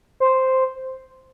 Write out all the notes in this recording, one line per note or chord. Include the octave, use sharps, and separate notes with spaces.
C5